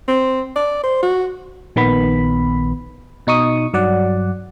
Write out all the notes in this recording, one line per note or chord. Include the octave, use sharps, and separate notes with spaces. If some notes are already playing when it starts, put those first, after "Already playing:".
C4
D5
C5
F#4
A#1 D#3 B3 B5
B2 D#4 C#6 D#6
G2 F#3 D5 F#5